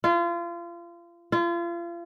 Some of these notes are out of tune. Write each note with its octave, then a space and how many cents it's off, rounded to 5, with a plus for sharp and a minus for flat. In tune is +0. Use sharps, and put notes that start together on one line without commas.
F4 -30
F4 -35